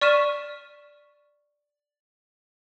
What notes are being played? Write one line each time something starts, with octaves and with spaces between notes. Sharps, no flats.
D5 C#6 F6 B6 D#7 E7